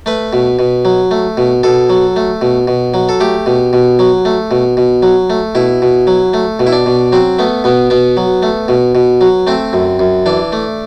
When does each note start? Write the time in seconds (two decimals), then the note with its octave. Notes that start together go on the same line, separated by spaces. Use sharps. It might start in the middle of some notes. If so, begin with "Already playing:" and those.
0.06 A3 B4
0.33 B2
0.59 B2
0.85 F#3
1.11 A3
1.37 B2
1.63 B2 A4
1.90 F#3
2.16 A3
2.41 B2
2.67 B2
2.94 F#3
3.09 A4
3.20 A3 G4
3.46 B2
3.73 B2
3.99 F#3
4.25 A3
4.51 B2
4.77 B2
5.03 F#3
5.30 A3
5.55 B2 E4
5.82 B2
6.07 F#3
6.34 A3
6.59 B2
6.67 E4
6.72 D4
6.86 B2
7.12 F#3 C4
7.39 A3 B3
7.64 B2 B3
7.90 B2 B3
8.17 F#3
8.43 A3
8.68 B2
8.95 B2
9.21 F#3
9.47 A3 C4
9.73 F#2
9.99 F#2
10.26 E3 D4
10.52 A3